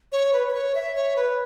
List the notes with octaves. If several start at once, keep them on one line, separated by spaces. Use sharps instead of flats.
C#5
B4
B4
C#5
E5
C#5
B4